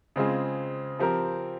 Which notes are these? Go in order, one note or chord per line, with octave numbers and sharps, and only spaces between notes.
C#3 G#3 C4 F4 G#4
F3 C4 G4 A#4